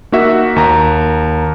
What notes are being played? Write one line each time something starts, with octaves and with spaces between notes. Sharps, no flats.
A#3 D#4 F#4 E5
D#2 A#5